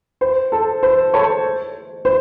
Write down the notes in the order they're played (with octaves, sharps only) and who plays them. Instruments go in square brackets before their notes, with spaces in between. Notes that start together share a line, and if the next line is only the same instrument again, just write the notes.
[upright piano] C5
A4
C5
A4 C#5
C5